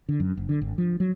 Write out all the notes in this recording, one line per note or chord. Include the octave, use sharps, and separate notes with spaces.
D3
F#2
F#1
D3
G#1
F3
F#3